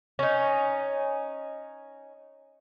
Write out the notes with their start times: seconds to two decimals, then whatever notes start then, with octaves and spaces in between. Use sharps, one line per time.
0.19 C#4 D#4